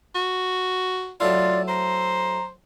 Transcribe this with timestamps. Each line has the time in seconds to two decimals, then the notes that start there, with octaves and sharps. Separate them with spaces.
0.15 F#4
1.20 F#3 A3 E4 F4 D5
1.68 C5 A#5